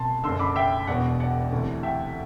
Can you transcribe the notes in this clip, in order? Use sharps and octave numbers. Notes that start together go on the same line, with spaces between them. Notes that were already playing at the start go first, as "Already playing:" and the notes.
Already playing: C2 B2 A5 C6
F#1 F#2 D3 C6 E6
B5 D6
E5 G5
E1 E2 B2 D5 F#5
D5 F#5
D2 C3 E3
E5 G5